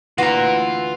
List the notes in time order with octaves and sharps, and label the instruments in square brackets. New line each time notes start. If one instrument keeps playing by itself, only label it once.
[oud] D2 E3 [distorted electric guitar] F4 A#5 [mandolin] F#4